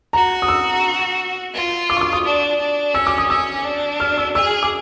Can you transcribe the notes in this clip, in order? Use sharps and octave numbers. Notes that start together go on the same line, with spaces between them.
F#4 A#5
D#6
E6
F4
D6
C#6
D6
D#6
D4
D4
C#4 E6
D6
D#6
C#4 E6
D4
F6
E6
G#4 E6
D6